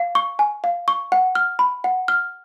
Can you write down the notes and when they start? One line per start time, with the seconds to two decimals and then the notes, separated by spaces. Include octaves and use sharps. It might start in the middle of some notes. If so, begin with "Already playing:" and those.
Already playing: F5
0.15 C#6
0.39 G#5
0.64 F5
0.88 C#6
1.12 F#5
1.35 F6
1.59 B5
1.84 F#5
2.08 F6